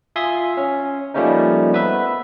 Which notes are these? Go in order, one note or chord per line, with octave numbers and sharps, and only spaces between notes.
F4 E5 G#5 C6 D#6
C#4
F3 G3 A3 A#3 C#4 D#4
B3 B4 E5